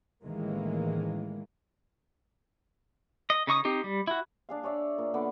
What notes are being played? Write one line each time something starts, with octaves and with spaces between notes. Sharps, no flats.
A1 D#3 E3 G#3 A#3
D#5
C#3 D#4 C#6 D#6
C4 D#4 G4
G3
E4 F#4
D4 G#4 F5
G#4 C#5 D5 E5
A#2
D3 B3 D5